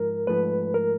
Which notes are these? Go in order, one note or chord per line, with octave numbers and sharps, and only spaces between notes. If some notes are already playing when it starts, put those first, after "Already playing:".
Already playing: G#2 F3 A#4
G#2 F3 A3 B4
A#4